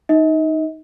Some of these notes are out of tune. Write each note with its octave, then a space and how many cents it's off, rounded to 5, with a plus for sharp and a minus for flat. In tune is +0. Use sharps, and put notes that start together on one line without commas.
D#4 +0 D#5 +40